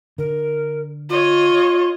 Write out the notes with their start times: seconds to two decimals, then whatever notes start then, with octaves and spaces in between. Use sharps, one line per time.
0.18 D3 A#4
1.10 F4 C#5 D#5